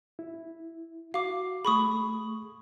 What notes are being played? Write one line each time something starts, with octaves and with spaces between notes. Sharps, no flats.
E4
F#4 F5 D6
A3 G#4 B5 C#6 D#6